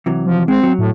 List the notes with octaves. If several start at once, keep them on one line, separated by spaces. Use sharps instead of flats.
C3 E3 F#3
F3
G#3 C4
F#3
A2